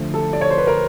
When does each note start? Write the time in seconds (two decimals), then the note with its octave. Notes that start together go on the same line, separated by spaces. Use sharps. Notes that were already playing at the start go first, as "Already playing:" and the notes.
Already playing: D3 F3 A3
0.14 A4
0.33 D5
0.41 C#5
0.50 C5
0.58 B4
0.67 A#4